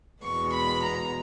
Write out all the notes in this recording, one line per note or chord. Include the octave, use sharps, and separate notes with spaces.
E2 B2 G#3 B3 C#6
B5
A#5